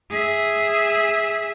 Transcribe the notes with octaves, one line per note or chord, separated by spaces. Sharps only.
G#4 E5